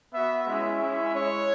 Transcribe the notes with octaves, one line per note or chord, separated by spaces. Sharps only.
B3 F#4 E5
G#3 C#4 E4 E5
G#3 C#4 E4
G#3 E4 C#5